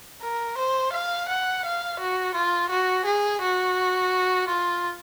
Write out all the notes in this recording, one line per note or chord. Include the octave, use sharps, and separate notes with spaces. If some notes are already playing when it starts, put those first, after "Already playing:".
A#4
C5
F5
F#5
F5
F#4
F4
F#4
G#4
F#4
F4